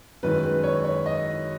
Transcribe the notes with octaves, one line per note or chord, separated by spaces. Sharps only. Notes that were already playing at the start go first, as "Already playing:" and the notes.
F#2 D#3 G#3 B4
B4
C#5
C#5
D#5